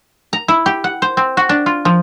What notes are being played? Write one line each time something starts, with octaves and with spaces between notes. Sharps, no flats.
A#5
E4
G4
F#5
C5
C4
F#4
D4
F4
F3